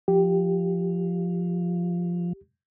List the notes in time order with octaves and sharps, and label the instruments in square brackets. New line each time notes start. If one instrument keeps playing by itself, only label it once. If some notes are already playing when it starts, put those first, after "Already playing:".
[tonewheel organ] F3 [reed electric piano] G4